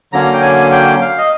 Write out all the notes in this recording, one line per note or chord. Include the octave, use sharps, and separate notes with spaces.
D3 F#3 A#3 C#4 A#5
G5
G#5
G5
F5
D#5